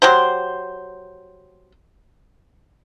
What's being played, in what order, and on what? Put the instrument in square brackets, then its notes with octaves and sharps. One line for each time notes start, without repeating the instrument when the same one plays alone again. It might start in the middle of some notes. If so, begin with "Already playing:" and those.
[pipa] F#3 G4 C5